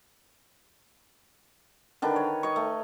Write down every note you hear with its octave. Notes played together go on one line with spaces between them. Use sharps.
D3 D#3 D4 B4
C#5
C#5 D#5 C#6
A3